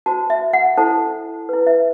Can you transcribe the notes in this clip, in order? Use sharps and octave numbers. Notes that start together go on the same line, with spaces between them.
F#4 C5 A5
E5
F#5
E4 A4 C5 A5
E4 B4
E5